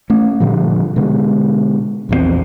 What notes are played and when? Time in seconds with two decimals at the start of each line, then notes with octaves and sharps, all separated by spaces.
0.10 A3 C#4
0.40 G2 A#2 D3 F3
0.96 B2 D3 G#3
2.09 A#1 E2 E3 C4